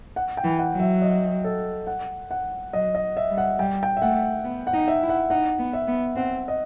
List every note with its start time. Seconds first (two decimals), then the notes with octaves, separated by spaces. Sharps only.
0.16 F#5
0.37 G5
0.44 E3
0.59 F#5
0.73 F#3
0.80 E5
1.02 D#5
1.44 A4
1.87 F#5
2.31 F#5
2.73 F#3 D#5
2.95 D#5
3.17 E5
3.30 G3
3.38 F#5
3.59 G3 G5
3.83 G5
3.97 E5
4.02 A3 F#5
4.44 B3
4.67 F#5
4.73 D#4
4.88 E5
5.03 E4
5.09 F#5
5.30 D#4 F#5
5.58 B3
5.73 E5
5.88 B3
6.16 C4 F#5
6.48 D#5